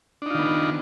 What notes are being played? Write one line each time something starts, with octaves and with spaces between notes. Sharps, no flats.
D#3 B3 D4 D#4 F4